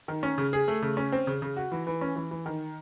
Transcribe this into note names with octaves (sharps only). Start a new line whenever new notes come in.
D#3
C#4
C#3
G#4
A3
C#3
C#4
C4
C#3
C#3
F#4
E3
E3
C#4
E3
E3
D#3